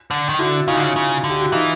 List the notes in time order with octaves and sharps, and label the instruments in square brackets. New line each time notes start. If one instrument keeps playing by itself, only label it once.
[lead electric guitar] D3
D#3
[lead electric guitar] D3 [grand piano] E4 F#4
[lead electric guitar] C#3 [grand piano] D#4 F4
[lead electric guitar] D3
C#3
C#3
D3
[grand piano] G4
F#4
[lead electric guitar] E3 [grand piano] D#4 F4